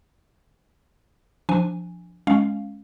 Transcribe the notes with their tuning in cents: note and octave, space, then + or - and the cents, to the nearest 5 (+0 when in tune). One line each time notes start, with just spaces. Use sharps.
F3 +0 D4 +0 G#5 -10
G#3 +10 C#4 +0 F5 +0